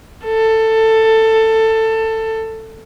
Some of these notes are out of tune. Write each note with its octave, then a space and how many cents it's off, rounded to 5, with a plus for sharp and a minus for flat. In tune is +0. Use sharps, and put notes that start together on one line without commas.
A4 +15